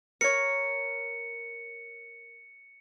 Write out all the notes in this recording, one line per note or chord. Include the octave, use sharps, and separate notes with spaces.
A#4 C#5 C#7